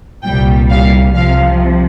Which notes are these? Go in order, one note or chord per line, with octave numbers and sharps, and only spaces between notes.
C2 A#2 G3 G5
F5
C2 C3 F3 F5